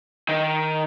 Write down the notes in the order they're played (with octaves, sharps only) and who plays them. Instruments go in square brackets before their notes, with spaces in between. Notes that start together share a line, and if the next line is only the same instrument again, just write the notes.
[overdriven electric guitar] D#3